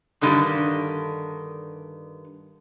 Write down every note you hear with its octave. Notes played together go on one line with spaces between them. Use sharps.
G2 D3 D#3 G3